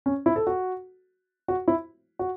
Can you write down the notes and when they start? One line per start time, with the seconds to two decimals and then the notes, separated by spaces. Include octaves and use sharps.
0.06 C#4
0.26 E4
0.36 A4
0.47 F#4
1.48 F#4
1.68 E4
2.19 F#4